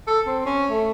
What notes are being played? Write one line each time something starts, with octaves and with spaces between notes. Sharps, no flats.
A4
C4
C#4
A3